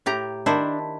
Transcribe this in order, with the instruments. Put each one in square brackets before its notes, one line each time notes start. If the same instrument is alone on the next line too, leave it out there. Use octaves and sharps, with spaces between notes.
[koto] A2 G4 A#5
[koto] D#3 E4 C5 [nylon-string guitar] D4